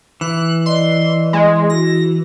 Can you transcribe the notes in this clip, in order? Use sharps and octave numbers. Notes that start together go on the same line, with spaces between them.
E3 F#6
D5 D#5 C6
G#3 C6
E4 F#4 A#6